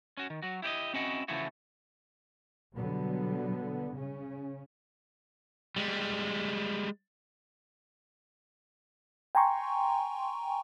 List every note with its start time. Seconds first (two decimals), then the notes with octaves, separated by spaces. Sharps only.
0.17 C#4 F#4
0.30 D#3
0.42 F#3 F#4
0.62 E4 G4 D5 D#5
0.94 C4 C#4 E4 F#4 D#5 F#5
1.28 C#3 E3 F3 A3 E4 F#4
2.73 B2 D3 F#3 G3 B3
3.94 C#3 C#4
5.76 G3 G#3
9.35 G5 G#5 A#5 C6 C#6